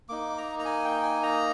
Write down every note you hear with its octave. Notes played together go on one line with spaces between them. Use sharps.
A#3 D#4 D6
A#5
A#5
G#5
G5
G#5
A#5